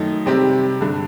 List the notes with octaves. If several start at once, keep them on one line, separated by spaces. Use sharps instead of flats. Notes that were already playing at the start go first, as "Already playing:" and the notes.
Already playing: F#2 D#3 A3 D#4
C3 G3 C4 G4
G2 D3